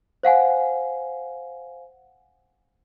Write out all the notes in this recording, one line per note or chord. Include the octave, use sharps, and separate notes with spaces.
C5 F5 F#5 G#5